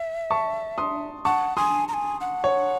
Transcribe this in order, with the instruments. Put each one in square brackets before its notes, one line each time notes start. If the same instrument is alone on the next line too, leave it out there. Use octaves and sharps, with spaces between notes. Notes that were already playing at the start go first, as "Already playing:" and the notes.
Already playing: [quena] E5
[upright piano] A5 C#6
C6 D#6
[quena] F#5 [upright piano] A5 C#6
[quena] G#5 [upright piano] C6 D#6
[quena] A#5
G#5
F#5
[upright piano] C#5